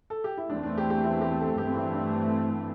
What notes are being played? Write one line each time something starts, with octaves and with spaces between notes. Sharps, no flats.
A4
G4
E4
E2 E3 A3 C4 D4
D4
G4
G4
E4
G4
A4
G2 E3 A3 C4 G4
E4
D4